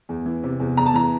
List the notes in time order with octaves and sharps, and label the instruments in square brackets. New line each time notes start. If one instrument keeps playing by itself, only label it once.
[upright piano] E2
E3
C3
E2
E2 A#5
A5
E3 A#5